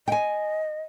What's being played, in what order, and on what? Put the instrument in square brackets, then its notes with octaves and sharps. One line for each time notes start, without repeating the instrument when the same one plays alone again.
[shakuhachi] D#5 [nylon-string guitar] G5 G#5